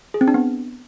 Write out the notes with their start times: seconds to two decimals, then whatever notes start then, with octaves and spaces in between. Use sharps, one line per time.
0.14 G#4
0.21 C4
0.28 D4
0.34 B3